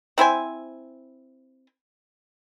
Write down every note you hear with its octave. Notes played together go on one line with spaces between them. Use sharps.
C4 E4 C5 G#5